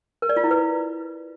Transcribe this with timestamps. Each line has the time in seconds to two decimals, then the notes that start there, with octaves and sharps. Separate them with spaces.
0.22 A#4
0.29 D5
0.37 F4
0.44 E4
0.51 B4